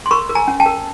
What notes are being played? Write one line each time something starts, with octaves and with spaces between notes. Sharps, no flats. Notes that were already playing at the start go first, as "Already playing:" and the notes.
C6
A#4 B5 C#6
A#4
G#5 A#5
C#4
G5 A5
A#4